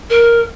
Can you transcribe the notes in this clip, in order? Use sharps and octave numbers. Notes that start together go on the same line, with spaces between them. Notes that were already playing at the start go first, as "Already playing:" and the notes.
A#4